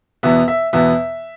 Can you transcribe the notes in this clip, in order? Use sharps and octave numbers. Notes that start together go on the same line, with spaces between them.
E2 B2 B3 E5
E5
E2 B2 B3 E5